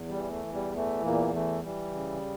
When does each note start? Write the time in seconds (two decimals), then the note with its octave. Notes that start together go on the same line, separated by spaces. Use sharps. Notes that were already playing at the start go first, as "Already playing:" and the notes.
Already playing: E2
0.09 G3
0.16 E3
0.30 A3
0.46 E2
0.53 G3
0.75 E3 A3
1.04 E2 A#2 A#3
1.34 E3 A3
1.64 E3 G3
1.93 C#3